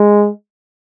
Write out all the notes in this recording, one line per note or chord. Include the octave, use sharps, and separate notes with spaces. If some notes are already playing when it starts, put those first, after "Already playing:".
Already playing: G#3